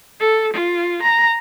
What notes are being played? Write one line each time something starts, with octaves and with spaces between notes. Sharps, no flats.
A4
F4
A#5